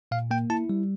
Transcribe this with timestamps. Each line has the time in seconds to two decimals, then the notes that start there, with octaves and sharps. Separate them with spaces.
0.11 A#2 F5
0.31 A#3 G5
0.50 E4 A5
0.69 G3